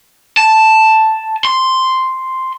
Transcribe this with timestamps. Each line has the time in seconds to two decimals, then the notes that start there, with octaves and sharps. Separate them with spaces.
0.37 A5
1.45 C6